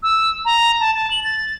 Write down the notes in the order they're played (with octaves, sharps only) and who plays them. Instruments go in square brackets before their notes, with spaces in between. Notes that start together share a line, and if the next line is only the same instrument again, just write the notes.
[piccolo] E6
A#5
A5
A5
F#7
A6